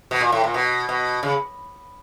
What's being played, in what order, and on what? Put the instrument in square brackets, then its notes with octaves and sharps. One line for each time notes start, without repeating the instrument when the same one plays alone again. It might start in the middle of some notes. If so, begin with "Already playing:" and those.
[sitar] B2
A#2
A2
A#2
B2
B2
C#3